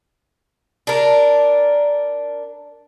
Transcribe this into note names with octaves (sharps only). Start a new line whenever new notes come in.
D4 A#4